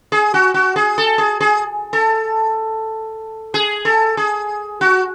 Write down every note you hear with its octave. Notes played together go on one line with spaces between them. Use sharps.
G#4
F#4
F#4
G#4
A4
G#4
G#4
A4
G#4
A4
G#4
F#4